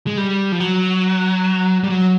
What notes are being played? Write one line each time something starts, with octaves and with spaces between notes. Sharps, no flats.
G#3
G3
F3
F#3
G3
F#3